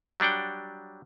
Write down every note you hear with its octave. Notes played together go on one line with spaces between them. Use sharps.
F#3 G3 D4 F#5 G5